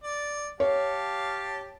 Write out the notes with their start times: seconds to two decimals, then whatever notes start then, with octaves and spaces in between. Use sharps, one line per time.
0.03 D5
0.60 G4 C#5 F5 A5